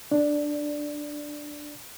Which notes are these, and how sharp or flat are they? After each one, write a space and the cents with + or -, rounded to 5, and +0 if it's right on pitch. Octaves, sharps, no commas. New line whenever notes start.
D4 +5 D5 +0